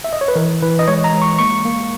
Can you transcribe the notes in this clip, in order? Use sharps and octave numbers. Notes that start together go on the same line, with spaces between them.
E5
D#5
C#5
B4
E3 A#4
E3 B4
D#5
G#3 C#5
A#5
G#3
C#6
A#3 C#6
A#3